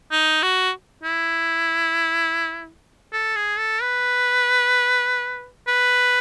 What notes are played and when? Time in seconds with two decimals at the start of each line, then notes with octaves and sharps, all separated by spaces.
0.11 D#4
0.43 F#4
1.03 E4
3.13 A4
3.36 G#4
3.58 A4
3.82 B4
5.67 B4